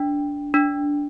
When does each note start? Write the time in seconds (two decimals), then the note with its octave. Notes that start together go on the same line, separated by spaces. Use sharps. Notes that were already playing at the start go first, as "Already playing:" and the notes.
Already playing: D4
0.54 D4